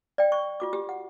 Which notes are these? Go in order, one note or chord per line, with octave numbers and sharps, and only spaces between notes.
D5 G5
C#6
F4 F#4 D6
G4
F#5